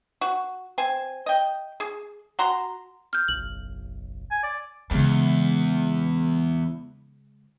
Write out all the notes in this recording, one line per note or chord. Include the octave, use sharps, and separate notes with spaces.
F#4
C4 G#5
D#5 G5
G#4
F#4 A#5 C6
F6 G6
F#1 B1 F#7
G#5
D5
E2 C#3 G#3